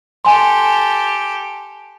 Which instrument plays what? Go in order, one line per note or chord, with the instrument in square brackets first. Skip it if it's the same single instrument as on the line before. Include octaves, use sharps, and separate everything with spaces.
[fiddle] G4 A4 [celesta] G#5 C6